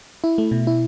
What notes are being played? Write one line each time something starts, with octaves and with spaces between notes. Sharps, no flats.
E4
A3
B2
E4